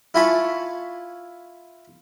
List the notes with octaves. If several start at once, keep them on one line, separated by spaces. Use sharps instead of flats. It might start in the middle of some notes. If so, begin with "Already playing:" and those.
E4 F4 G#5 A5 B5 C#6